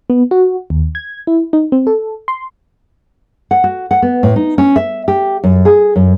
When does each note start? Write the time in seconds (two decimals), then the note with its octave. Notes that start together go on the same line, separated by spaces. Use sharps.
0.10 B3
0.31 F#4
0.70 D#2
0.95 G#6
1.27 E4
1.53 D#4
1.72 C4
1.87 A4
2.28 C6
3.51 F#5
3.64 F#4
3.91 F#5
4.02 B3
4.23 A2
4.36 D#4
4.58 C#4
4.76 E5
5.08 G4
5.44 F#2
5.65 G#4
5.96 F#2